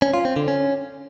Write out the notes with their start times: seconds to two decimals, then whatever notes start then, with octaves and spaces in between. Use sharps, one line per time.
0.02 C#4
0.14 F4
0.25 C4
0.36 D3
0.48 C#4